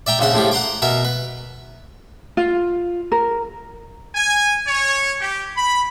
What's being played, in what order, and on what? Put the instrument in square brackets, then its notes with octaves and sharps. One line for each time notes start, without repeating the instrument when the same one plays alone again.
[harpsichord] D5 E5 G5 A#5
A#1 C#3 E5 F#5
A2 F3 E4 G4
F#5 A#5 C6 D6
B2 A#4 E5
B4
[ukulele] F4
A#4
[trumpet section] G#5
C#5
G4
B5